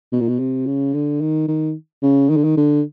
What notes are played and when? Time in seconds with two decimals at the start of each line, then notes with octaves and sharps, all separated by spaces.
0.12 B2
0.21 A#2
0.29 B2
0.40 C3
0.67 C#3
0.94 D3
1.21 D#3
1.48 D#3
2.03 C#3
2.30 D#3
2.37 D3
2.44 D#3
2.57 D3